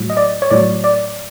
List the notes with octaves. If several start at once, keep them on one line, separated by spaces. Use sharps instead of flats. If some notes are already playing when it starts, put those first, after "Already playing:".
Already playing: A2 F#3
D#5
D5
C#5
A2 F#3 D5
D5